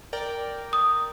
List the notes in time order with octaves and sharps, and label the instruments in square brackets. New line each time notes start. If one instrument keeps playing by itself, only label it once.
[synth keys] A#4 D5 G5
[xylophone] D#6